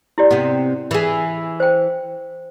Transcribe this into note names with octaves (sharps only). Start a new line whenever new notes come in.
E4 G4 D5
C3 B3
E3 G#4
C5 G5